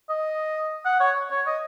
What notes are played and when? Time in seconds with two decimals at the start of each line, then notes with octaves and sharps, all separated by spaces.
0.09 D#5
0.85 F#5
1.00 C#5
1.31 C#5
1.47 D#5